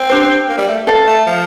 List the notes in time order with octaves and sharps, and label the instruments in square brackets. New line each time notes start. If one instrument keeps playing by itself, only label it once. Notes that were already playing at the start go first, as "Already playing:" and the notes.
Already playing: [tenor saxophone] C4
[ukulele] D4 G4 C5
[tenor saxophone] A#3
G3
A3
[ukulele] A4 D5 F5
[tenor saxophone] A3
F3